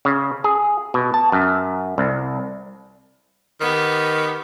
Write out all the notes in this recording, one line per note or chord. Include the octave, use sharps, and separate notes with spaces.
C#3
G#4
B2
A5
F#2
C2
D#3 B3 G4